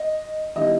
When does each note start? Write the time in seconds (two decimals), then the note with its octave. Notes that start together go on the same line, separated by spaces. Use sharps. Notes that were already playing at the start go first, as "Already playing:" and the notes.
Already playing: D#5
0.55 D#3 G3 B3 E4 D#5